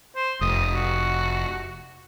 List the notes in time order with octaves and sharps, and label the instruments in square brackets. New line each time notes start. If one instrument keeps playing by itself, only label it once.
[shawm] C5
[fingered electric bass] F1 [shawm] D#6
[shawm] F#4